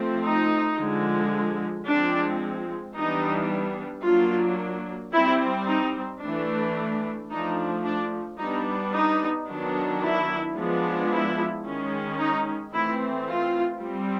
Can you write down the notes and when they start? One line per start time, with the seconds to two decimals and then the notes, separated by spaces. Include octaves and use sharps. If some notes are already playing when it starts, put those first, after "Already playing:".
Already playing: F3 A3 C4
0.24 D#4
0.78 D3 F3 G#3
1.86 F3 G#3 C4 D4
2.96 E3 G3 B3 D4 D#4
4.04 F#3 A#3 D4 F4
5.13 G3 C4 E4
5.67 D#4
6.22 E3 A3 D4
7.30 F3 A3 D4 D#4
7.84 D4
8.38 G3 B3 D4 D#4
8.94 D#4
9.48 D#3 F#3 B3 D4
10.03 E4
10.56 F3 G#3 B3 D4
11.11 E4
11.65 D#3 G#3 C#4
12.19 D#4
12.73 E3 A3 C4 E4
13.28 F4
13.82 G3 C4